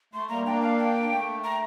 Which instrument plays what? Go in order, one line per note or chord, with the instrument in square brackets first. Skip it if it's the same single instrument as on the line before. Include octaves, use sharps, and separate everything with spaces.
[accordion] A3 [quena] C6
[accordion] G3 A#3 [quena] A#5
[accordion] A#3 D4 [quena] G5
[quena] F5
G5
[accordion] A3
[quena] A#5